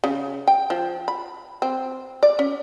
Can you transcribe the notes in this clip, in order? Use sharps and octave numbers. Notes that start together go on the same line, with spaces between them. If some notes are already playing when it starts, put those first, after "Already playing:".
C#3
G5
F3
B5
C4
D5
C#4